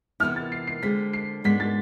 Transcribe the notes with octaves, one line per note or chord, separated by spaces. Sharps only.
C3 E3 B3 E4 F6
A6
C7
C7
D3 G#3 C4 B6
C7
G#2 G#3 B3 D4 B6
A6